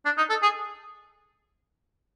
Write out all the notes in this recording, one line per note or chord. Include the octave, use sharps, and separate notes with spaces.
D4
D#4
A4
G#4